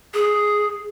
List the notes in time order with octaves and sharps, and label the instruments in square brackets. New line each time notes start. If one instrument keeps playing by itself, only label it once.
[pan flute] G#4